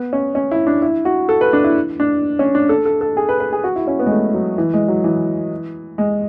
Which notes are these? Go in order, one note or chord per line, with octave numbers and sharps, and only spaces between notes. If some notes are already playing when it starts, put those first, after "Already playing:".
Already playing: B3
C#4
C#4
E4
D4
E4
F#4
A4
B4
D4
E4
D4
C#4
D4
A4
A4
A4
G#4
B4
B4
G#4
F#4
E4
C#4
B3
G#3
A3
F#3
E3
G#3
F#3
E3
G#3